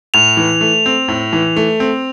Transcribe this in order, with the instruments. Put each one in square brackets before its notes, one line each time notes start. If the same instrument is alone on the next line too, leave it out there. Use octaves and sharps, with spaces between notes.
[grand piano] A2 [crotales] F7
[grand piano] E3
A3
C4
A2
E3
A3
C4